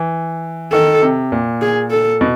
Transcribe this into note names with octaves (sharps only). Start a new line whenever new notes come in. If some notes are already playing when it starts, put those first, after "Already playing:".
Already playing: E3
D#3 A4
C3
A#2
G#4
A4
B2